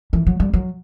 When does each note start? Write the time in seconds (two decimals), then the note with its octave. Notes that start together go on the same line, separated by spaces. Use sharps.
0.13 E3
0.27 F#3
0.40 G3
0.53 F#3